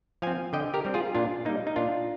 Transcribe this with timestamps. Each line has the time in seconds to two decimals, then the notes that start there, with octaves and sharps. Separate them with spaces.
0.22 F3 C4 F5 G#5
0.53 D3 D#5 G5
0.74 G4 A#4
0.85 G3 C4
0.94 F4 G#4
1.15 A#2 D4 F4
1.45 G3 A#3 D#4
1.67 D#4
1.76 A#2 D4 F4